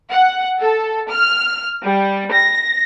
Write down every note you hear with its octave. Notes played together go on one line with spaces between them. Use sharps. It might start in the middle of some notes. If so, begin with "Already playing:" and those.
F#5
A4
F6
G3
A#6